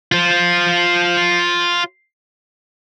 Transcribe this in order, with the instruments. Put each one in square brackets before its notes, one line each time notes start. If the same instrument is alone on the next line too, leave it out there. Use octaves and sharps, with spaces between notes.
[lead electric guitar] F4 C5